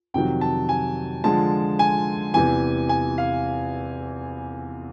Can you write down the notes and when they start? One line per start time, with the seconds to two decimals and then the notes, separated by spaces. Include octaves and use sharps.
0.14 F2 C3 D#3 F#3 G5
0.41 A5
0.69 G#5
1.24 D3 F3 G#3 A5
1.79 G#5
2.34 E2 C3 E3 G#5
2.89 G#5
3.18 F5